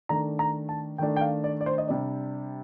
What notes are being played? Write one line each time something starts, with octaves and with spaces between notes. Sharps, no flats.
D#3 A3 D4 A#5
A#5
A5
D#3 A3 D4 G5
G5
F5
D5
D5
C5
D#5
C3 G3 D4 D5